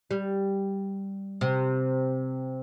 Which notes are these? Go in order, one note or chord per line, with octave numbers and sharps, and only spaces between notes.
G3
C3